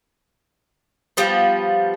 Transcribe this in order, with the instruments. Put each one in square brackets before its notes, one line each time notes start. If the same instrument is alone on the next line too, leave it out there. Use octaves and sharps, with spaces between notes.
[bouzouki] F3 G3 B3